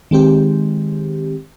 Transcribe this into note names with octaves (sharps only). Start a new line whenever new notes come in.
D#3 G#3 C4 G4